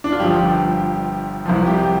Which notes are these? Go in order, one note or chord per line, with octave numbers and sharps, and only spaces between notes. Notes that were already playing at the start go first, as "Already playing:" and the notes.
D4
F4
G1 G2 F3 G4
C2 C3 F3
G4
G4